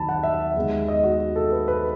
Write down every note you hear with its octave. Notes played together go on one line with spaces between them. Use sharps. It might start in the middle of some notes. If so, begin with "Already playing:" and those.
Already playing: D#2 D#3 F#3 A5 B5
F#5
E5
D#2 D#3 G#3 B3
D#5
F#4
A4
B4
B4